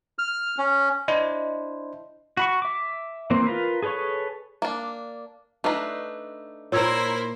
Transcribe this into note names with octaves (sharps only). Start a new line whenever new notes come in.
F6
C#4
D4 E4 C5 D#5
F#4 B5 C#6
E5 D6
E3 A#3 C4 C5
F4 A#4 B4
G#4 A4 B4 C#5 C#6
A#3 D4
A3 D4 D#4 B4 F5
A#2 E4 A#4 C5 C#5 E6 G#6